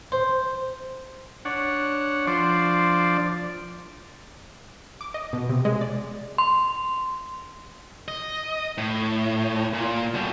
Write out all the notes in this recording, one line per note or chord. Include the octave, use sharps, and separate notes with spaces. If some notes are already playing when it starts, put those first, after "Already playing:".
C5
D4 C#5 F#5
F3 D4 C5 D5
D6
D#5
B2
C3
G#3
D5
C6
D#5
A2
A#2
B2 G3